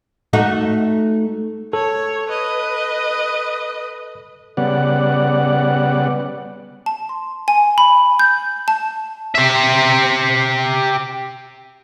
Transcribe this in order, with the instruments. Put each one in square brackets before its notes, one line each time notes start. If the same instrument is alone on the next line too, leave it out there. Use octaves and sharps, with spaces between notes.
[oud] A3 D#4 F#4
[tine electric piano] A4 [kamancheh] C#5
[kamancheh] B4 D#5
[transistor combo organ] C#3 G3 B3 D5 F#5
[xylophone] A5
C6
G#5
B5
G6
A5
[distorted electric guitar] G4 E5